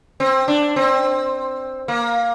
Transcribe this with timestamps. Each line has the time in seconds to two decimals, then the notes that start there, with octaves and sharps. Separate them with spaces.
0.20 C4
0.48 D4
0.76 C4
1.88 A#3